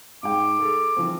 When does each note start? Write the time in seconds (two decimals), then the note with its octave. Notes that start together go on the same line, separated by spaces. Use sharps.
0.23 G#2 G#4 G5 D6
0.59 G#4 A4
0.97 E3 F3 C4